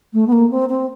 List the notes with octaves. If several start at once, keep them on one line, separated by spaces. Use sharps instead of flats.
A3
B3
A#3
C4
C4